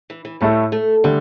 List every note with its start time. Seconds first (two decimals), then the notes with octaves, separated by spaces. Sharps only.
0.10 E3
0.25 E3
0.41 A2 G3 A3 E4 A4
0.72 A3
1.04 D3 G3 A3